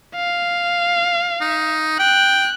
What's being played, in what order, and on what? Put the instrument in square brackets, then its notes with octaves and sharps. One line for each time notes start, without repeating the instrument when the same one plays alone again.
[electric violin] F5
[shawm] D#4
[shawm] G5 [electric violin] F#6